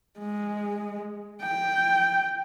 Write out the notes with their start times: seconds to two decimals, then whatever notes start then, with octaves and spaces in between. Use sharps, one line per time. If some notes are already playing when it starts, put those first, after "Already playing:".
0.18 G#3
1.42 G5